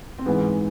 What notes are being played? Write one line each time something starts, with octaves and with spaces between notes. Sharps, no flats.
C4
G#2 E3 G#3 B3